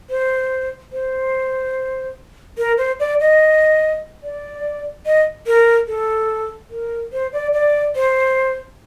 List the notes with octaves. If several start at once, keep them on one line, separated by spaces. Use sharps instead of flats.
C5
C5
A#4
C5
D5
D#5
D5
D#5
A#4
A4
A#4
C5
D5
D5
C5